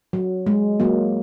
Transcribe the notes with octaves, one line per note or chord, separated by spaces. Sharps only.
F#3
G#3
F#3 A#3